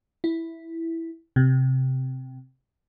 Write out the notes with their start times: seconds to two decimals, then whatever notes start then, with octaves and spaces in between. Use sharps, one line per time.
0.24 E4
1.36 C3